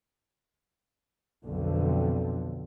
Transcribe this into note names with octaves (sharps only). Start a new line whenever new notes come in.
B1 F2 D3